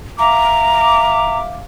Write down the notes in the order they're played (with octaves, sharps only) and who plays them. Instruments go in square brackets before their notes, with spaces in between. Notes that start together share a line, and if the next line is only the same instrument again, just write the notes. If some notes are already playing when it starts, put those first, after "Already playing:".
[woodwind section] E5 F5 D6 [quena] A#5